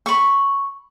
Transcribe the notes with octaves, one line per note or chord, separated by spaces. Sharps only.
B5 C#6